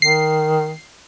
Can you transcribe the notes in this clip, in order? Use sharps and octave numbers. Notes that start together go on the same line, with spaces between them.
D#3 C7